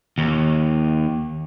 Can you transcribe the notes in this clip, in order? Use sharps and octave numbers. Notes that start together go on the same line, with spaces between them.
D#2